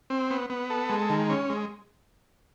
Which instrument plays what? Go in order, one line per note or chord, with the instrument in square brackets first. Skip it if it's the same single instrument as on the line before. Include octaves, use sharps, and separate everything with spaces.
[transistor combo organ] C4
B3
B3
A4
G#3
D#3
C#4
G#3